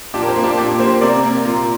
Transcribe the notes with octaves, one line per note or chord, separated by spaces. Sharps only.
A#2 D4 G4
A#4
G4 C5
A#3
D4 G4
A#2 D4 G4
A#3 G4 C5
C3 A#4 D5
A#3
A#2 F4 A#4